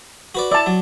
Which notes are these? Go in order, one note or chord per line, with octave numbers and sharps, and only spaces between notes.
F#4 B4 D5
E4 D5 A5
F#3